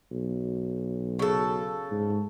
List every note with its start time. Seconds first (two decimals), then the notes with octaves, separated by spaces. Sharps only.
0.11 B1
1.19 C#3 A4
1.91 G#2